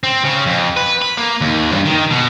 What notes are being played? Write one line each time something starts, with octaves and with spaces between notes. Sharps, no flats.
C4
C#3
F2
B4
B5
A#3
D#2
G2
D#3
B2